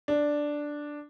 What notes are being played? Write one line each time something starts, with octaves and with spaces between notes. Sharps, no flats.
D4